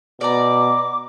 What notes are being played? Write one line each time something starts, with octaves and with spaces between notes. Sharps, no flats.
B2 D5 A#5 D6